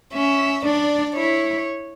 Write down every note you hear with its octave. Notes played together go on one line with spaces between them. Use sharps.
C#4 E5
D4 D5
E4 C#5